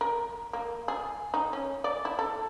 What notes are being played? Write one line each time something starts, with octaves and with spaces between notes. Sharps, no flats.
A#4
A#3
G#4
D#4
C#4
D5
E4
A4